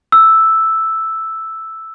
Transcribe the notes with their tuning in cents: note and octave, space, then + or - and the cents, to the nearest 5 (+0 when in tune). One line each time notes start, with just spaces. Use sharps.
E6 +0